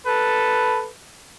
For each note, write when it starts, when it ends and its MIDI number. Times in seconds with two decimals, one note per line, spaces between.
0.06 0.87 69
0.06 0.87 71